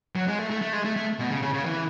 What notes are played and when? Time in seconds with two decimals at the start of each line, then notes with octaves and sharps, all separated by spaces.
0.16 F#3
0.28 G#3
0.39 A3
0.50 A3
0.62 A3
0.73 G#3
0.85 A3
0.96 A3
1.19 B2
1.31 C#3
1.42 C#3
1.54 C#3
1.65 E3